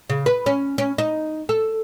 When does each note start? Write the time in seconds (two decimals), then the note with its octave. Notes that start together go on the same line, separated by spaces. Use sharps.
0.10 C#3
0.26 B4
0.46 C#4
0.78 C#4
0.98 D#4
1.49 A4